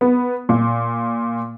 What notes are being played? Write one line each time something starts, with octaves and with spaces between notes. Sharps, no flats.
B3
A#2